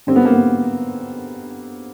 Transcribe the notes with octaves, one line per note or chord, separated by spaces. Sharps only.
D3 G3 C4
B3
A#3
B3